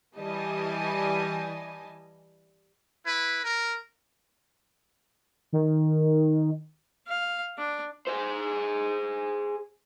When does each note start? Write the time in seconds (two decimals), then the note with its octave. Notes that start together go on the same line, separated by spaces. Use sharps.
0.17 E3 G3 D#5 G#5 A5
3.05 E4 B4
3.44 A#4
5.53 D#3
7.08 F5
7.58 D4
8.07 G#4 C5